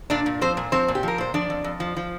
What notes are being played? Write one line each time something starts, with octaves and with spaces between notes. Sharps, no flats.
A#2 D4 D5
A#2
F3 C4 C5
A#2
F3 C4 C5
A#2
G4
F3 A#4
A#2 C5
F3 D4 D5
F2
F2
F3
F3